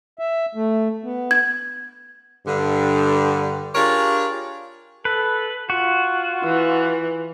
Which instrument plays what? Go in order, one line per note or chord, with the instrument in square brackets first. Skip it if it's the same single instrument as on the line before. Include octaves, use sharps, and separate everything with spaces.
[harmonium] E5
A3
B3
[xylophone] G#6
[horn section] G2 D3
D4 F4 G4 G#4 A#4 C#5
[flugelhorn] A4 [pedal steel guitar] B4
[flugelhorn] F4 [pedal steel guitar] F#4
[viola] E3